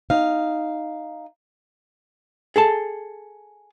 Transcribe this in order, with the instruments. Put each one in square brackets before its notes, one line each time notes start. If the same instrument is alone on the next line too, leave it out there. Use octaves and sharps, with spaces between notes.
[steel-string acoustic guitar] D#4 F5
[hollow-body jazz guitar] G#4 A4 A5